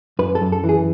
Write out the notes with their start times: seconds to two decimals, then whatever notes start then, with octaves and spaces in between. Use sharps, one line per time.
0.19 F#2 B4
0.35 A4
0.41 F#2
0.52 A4
0.64 E3
0.69 G#4